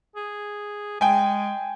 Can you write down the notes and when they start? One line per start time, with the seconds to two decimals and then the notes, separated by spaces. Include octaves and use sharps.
0.16 G#4
1.01 G#3 G5 G#5